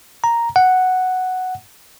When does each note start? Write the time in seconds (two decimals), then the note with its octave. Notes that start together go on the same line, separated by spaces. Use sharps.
0.24 A#5
0.56 F#5